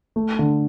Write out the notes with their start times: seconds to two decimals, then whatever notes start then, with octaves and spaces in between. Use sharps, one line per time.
0.16 A3
0.39 D3